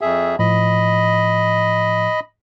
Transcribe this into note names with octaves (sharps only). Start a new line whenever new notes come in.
F2 G#4 E5
A2 F3 D#5 B5